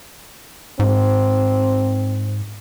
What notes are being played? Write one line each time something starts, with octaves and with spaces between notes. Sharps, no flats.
G#2 C4